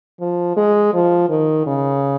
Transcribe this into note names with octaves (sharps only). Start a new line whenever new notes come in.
F3
G#3
F3
D#3
C#3